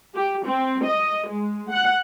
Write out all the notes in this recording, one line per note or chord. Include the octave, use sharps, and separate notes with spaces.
G4
C4
D#5
G#3
F#5